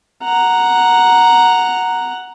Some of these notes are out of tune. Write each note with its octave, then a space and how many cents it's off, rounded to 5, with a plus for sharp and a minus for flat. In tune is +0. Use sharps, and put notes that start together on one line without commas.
F#5 +0 A#5 +0